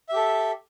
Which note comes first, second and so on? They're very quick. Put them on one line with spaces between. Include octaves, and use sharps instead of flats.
E5 G4 A4